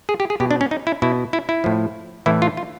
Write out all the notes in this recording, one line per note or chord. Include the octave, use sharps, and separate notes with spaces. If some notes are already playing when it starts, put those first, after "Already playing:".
G#4
G4
G#4
B2 G4
D4
C#4
D#4
E4
B2 E4
E4
E4
A2 F3
A2 E3 E4
F4
F4